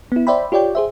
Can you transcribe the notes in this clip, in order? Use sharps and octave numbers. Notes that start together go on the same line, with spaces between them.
B3 E4
C5 D5 E5 G5 B5
F4 G4 C#5 D5 G5
G#4 C5 E5